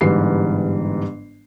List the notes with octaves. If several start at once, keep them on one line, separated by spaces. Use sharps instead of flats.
G1 G#2 E3 G3 C7